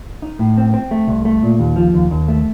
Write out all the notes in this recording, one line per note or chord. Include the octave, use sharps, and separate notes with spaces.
D#4
A2
C4
C4
A3
C2
A3
A#2
D#2
F3
D#2
D#2
A3